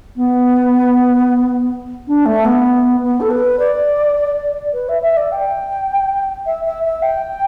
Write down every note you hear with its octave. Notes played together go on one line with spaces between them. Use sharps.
B3
D4
A3
B3
B3
A4
B4
D5
B4
E5
E5
D5
G5
E5
E5
E5
G5